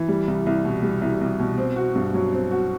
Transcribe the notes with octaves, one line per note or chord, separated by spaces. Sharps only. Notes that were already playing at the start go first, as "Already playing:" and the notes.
Already playing: E3
G3
C2
C2
B2
G3
C2
C2
B2
C4
F#4
G2
F#3
C4
F#4